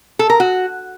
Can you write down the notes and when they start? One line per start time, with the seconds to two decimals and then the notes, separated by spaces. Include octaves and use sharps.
0.19 A4
0.30 A#4
0.40 F#4